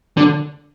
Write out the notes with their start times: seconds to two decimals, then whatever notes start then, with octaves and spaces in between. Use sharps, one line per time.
0.17 D3